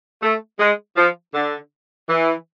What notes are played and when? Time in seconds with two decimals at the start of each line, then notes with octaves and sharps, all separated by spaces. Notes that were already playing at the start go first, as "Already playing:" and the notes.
0.23 A3
0.59 G#3
0.97 F3
1.34 D3
2.09 E3